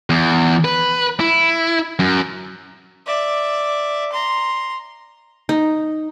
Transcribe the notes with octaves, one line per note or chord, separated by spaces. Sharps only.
E2
B4
E4
F#2
D5 E5
A#5 C6
D#4